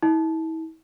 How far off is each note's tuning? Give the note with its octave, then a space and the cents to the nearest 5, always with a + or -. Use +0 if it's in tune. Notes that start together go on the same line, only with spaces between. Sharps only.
E4 -40